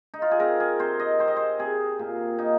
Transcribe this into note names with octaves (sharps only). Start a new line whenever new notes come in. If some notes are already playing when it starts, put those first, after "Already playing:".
D#4
F4
G#4
C4 A#4
G#4
C3 C5
D#5
C4 C5
D#5
C5
C3 G#4
A#2
A#3 D#4